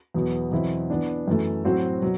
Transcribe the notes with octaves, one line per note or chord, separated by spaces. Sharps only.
E2 B2 F#3 B3
E2 B2 F#3 C4 E4
E3 B3 D4
F#2 E3 A3
A2 F#3 C4 F#4 C5
B2 F#3